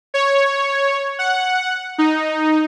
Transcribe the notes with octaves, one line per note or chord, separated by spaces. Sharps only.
C#5
F#5
D#4